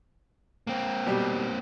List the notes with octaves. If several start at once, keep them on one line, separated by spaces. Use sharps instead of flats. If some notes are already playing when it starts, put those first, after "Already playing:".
A#3 C4
B2 G3